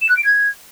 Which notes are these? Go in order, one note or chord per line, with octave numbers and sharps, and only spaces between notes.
E7
F#6
D7
G#6